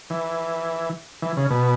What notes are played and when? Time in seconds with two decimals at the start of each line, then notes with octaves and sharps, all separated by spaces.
0.10 E3
1.22 E3
1.37 C#3
1.51 B2